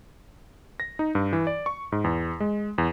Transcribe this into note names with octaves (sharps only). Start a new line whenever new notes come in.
A#6
D#4
G2
E3
D5
C#6
G#2
E2
G#3
E2